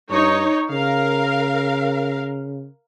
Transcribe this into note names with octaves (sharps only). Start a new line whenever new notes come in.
G2 D#4 C#5
C#3 A#4 F5